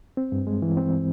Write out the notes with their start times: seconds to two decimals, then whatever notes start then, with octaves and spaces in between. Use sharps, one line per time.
0.17 C4
0.32 G2
0.47 G#3
0.62 E3
0.77 C4